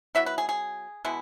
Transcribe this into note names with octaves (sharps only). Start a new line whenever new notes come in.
F#3 B3 E4 E5
B4
G#4
G#4
B2 G#3 B3 E4